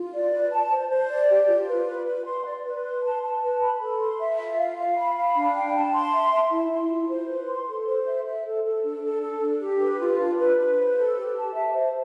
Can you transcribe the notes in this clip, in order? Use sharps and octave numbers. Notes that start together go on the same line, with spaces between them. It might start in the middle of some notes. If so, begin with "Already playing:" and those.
Already playing: F4
D5
B4
A5
C5
C5
D5
G4
F4
B4
B4
B4
C6
D5
B4
C6
A5
A5
B4
B5
A4
C6
E5
F4
F5
F5
B5
F5
D4
G5
A5
C6
E5
E5
E4
E4
F4
C5
B4
C6
A4
C5
E5
E5
A4
A4
D4
A4
A4
D4
G4
B4
F4
D4
B4
B4
C5
A4
G4
A5
E5
C5